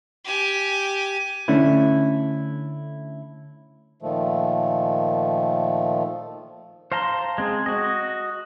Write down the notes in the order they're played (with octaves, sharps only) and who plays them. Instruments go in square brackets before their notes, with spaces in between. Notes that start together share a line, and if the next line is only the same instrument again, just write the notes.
[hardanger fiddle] G4 G#5
[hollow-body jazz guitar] D3 A3 C#4 D4 E4
[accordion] A#2 D#3 F3 A3
[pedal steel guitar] C5 F5 A5 A#5 C6
G#3 C4 G#4
F#4 D#5